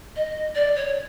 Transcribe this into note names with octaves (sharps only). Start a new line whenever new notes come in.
D#5
D5
C#5